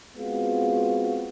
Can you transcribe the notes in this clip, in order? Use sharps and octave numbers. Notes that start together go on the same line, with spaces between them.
G#3 B3 C4 F4 F#4